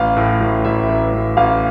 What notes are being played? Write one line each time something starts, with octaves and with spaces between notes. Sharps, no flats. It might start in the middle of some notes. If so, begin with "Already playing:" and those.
Already playing: A1 F5
A2
A1
A1 E5
A1
A1
A1 F5